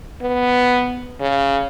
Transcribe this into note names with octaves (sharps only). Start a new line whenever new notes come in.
B3
C#3